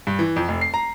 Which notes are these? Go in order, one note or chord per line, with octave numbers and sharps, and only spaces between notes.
G2
E3
F2
F1
C7
A#5